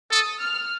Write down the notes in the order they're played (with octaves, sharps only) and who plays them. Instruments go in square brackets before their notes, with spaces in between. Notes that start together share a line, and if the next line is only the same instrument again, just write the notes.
[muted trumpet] A4 [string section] D#6
[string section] F6